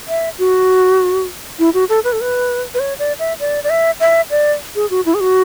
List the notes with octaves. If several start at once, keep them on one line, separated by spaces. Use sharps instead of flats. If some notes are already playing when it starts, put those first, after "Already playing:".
E5
F#4
E4
F#4
A4
B4
A4
B4
B4
C#5
D5
E5
D5
D5
E5
E5
D5
G#4
F#4
E4
G#4
F#4